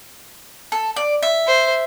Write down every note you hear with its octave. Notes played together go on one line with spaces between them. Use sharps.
A4
D5
E5
C5